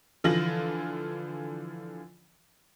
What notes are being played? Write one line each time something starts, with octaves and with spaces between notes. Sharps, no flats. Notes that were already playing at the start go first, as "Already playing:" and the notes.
D3 E3 F3 F4 A#6 F#7